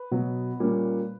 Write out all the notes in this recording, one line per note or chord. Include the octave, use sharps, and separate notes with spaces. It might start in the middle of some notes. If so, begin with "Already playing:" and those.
Already playing: B4
B2 F#3 B3
A#2 G3 A#3 C#4